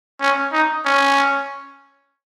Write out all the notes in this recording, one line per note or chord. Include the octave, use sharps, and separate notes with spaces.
C#4
D#4
C#4